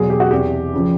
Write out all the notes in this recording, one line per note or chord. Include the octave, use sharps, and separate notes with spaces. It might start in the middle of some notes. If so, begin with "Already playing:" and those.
Already playing: E2 B2 F#3 G#4
G4
F#4
E2 C3 E3 G4
C#3 F3